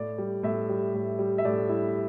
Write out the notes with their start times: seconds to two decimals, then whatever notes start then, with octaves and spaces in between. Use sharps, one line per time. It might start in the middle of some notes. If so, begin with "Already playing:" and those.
Already playing: A2 D5
0.18 G3
0.43 A2 E5
0.69 G3
0.94 A2
1.19 G3
1.38 E5
1.45 A2 D5
1.69 G3 E4